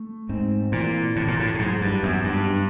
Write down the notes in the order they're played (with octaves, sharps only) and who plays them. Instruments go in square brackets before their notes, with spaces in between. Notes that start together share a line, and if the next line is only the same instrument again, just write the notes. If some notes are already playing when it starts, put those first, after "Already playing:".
Already playing: [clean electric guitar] A3
[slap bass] G#2 [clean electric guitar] C4
[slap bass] A#2 [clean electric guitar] E3
[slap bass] A2 [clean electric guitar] E3
[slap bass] A#2
A2
A2
[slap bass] G#2 [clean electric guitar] F#3
[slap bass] G2
[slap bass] F#2 [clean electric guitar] B3
[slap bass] G2
[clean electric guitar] D4